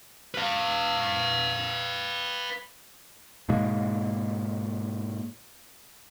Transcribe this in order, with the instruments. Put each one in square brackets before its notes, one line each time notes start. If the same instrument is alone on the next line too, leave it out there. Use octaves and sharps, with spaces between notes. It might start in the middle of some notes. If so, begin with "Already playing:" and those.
[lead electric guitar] B4 F5
[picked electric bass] G#2 B2 G#3 A#3